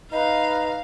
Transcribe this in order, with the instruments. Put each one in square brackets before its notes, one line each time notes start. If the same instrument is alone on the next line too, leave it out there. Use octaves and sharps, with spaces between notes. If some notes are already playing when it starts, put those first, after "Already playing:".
[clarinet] D#4 [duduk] B4 [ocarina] D#5 [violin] F5